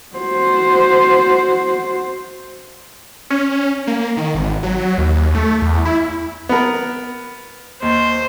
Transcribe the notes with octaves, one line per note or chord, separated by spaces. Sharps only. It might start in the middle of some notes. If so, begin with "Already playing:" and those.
F#4 C5
C#4
A#3
D#3
G#1
F#3
D#2
A3
E2
E4
B3 A#4
D#2 C5